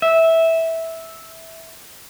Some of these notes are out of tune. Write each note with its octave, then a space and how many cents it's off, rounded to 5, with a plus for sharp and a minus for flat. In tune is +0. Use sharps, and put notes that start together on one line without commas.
E5 -10